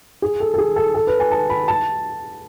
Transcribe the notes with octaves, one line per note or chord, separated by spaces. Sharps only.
G#4
A4
A4
G#4
A4
A4
B4
G#5
A5
B5
A5